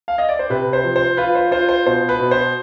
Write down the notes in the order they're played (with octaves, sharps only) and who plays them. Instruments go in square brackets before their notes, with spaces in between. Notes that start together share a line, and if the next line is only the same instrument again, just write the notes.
[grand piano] F5
D#5
D5
C5
C3 B4
C5
F3
C5
F4 B4
C5
F4 C5
C5
B2 C5
B4
B2
C5